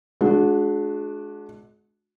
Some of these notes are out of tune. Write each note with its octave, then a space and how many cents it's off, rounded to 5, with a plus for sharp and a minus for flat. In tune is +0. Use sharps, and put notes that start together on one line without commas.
G#3 +35 D4 +0 F#4 -30